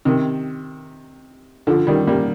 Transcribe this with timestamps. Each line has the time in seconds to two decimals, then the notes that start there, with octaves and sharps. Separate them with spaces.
0.05 C3 D#3
1.67 D3 F3
1.87 D#3 G3
2.07 G3 A#3